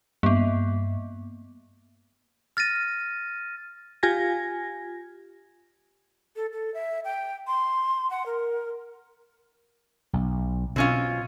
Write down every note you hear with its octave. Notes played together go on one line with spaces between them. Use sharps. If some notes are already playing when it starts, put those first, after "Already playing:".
G2 A#3 B3
F6 A6 A#6 D#7
F4 G4 G#5 G#6 A#6
A4
A4
E5
G5
C6
F#5
A#4
B1
B2 C4 C#4 F4